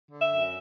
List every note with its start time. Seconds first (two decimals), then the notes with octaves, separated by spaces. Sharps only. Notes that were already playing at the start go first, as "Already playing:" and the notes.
0.11 D3
0.22 E5
0.32 F#2